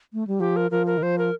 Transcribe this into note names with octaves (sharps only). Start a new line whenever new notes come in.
A3
G3
F3 G4
A#4
F3 A#4
A#4
D#3
F3 C5
A#4